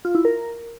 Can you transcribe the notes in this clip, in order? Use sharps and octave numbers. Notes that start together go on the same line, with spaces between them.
F4
E4
A#4